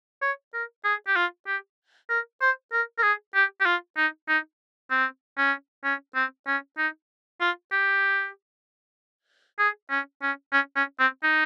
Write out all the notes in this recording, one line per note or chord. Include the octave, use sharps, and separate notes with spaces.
C#5
A#4
G#4
G4
F4
G4
A#4
C5
A#4
A#4
G#4
G4
G4
F4
D#4
D#4
C4
C#4
C#4
C4
C#4
D#4
F4
G4
G#4
C#4
C#4
C#4
C#4
C4
D#4